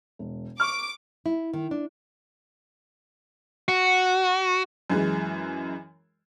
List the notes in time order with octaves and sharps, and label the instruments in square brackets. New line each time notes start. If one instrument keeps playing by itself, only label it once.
[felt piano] E1
[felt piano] C#6 F6 [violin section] D6
[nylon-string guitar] E4
D#3
D4
[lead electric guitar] F#4
[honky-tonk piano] F#2 E3 G#3